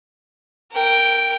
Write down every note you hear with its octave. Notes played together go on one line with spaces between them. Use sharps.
A#4 G5